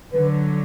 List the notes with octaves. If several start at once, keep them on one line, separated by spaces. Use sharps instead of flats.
D3 F#3 B4